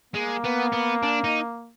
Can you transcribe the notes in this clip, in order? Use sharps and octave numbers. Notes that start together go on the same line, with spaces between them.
G#3 A#3
B3
B3
D4
D#4